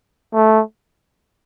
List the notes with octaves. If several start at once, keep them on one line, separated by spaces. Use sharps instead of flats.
A3